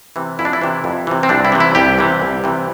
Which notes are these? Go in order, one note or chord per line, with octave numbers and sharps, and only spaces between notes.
C3 E3
F2 E4
D4
E4
C3 E3
F2
C3 E3
C4
C2 D4
E4
C3 E3
E4
C2 G4
C3 E3
C2
C3 E3